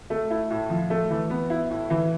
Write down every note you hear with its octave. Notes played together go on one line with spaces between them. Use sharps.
A3
E4
A2
F3
A3
E3
B3
E4
A2
E3